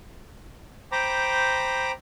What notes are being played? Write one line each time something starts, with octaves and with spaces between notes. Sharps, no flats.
C5 G5 A#5 B5 D6